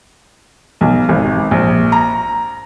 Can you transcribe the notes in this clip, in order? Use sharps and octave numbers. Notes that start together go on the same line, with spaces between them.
B1
G#1
A#1
A#5